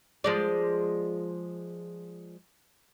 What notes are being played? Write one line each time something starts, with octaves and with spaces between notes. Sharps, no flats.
F3 G#3 D5